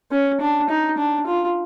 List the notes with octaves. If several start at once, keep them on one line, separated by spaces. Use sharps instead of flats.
C#4
D4
D#4
D4
F4